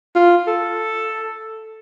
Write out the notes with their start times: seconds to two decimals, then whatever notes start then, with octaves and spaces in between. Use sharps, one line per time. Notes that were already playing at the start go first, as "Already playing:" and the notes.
0.15 F4
0.47 A4